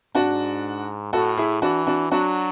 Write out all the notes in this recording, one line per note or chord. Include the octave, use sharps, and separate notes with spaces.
G#2 D4 F#4
A2 F#4 A4
E4 G#4
E3 D4 F#4
D4 F#4
F#3 D4 F#4